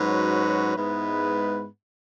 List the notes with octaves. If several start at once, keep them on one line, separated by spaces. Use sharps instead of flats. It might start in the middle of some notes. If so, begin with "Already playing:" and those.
Already playing: G#2 F#3 C#4 F#4 B4
G#2 G#3 B3 E4 B4